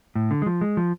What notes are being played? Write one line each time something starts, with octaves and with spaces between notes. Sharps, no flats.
A2
D3
G#3
F3
G#3
F3